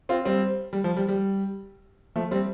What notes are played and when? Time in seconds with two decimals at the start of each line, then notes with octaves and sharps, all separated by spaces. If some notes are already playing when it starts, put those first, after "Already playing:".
0.09 C4 F4
0.25 G3 C4
0.73 G3
0.84 F3
0.97 G3
1.08 G3
2.16 F3 A3
2.31 G3 C4